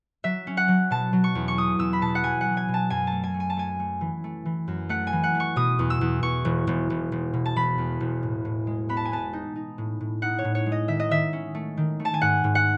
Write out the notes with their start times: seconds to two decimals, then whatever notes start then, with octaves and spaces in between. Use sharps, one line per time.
0.24 F#3 E5
0.47 C#4
0.57 F#5
0.68 F#3
0.91 B2 A5
1.13 F#3
1.24 C#6
1.35 E2
1.48 C#6
1.57 C#4 D#6
1.79 E2 E6
1.93 B5
2.01 B2 A5
2.15 F#5
2.23 F#3 G#5
2.41 F#5
2.46 F#3
2.57 G#5
2.68 B2
2.74 A5
2.90 F#2 G#5
3.07 A3 A5
3.23 G#5
3.34 A3
3.40 G#5
3.50 A5
3.57 A3 G#5
3.80 A3
4.01 E3
4.24 A3
4.46 E3
4.68 F#2
4.89 A3 F#5
5.07 G#5
5.13 E3
5.24 F#5
5.35 A3
5.40 C#6
5.56 B2 D#6
5.79 E2
5.90 E6
6.01 E2
6.23 E2 C#6
6.45 E1
6.67 E1
6.90 E1
7.12 E1
7.33 B2
7.46 A5
7.56 E1 B5
7.78 E2
8.00 E1
8.23 A2
8.45 A2
8.67 G#3
8.89 B3 B5
8.97 A5
9.05 G#5
9.12 B3 A5
9.33 D#4
9.56 D#4
9.78 A2
10.00 A2
10.22 D#4 F#5
10.39 C#5
10.45 A2
10.55 C#5
10.66 G#3
10.72 D#5
10.88 D#3 E5
11.00 D#5
11.11 D#3 E5
11.33 C#4
11.55 A3
11.77 D#3
12.00 A3
12.05 A5
12.14 G#5
12.21 G#2 F#5
12.44 G#2
12.55 F#5